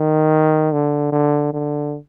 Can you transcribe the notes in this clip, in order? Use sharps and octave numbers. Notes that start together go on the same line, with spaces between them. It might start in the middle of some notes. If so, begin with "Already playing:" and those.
Already playing: D#3
D3
D3
D3